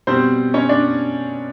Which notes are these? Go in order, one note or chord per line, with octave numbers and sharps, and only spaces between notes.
B2 G3 C4 C5
C#4 C#5
D4 D5